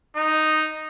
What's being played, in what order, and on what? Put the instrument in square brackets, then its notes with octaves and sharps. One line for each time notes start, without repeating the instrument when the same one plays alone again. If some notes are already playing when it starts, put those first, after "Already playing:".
[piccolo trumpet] D#4